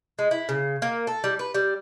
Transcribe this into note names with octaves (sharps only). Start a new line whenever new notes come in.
G#3
E4
C#3
A#3
A4
G3
B4
G3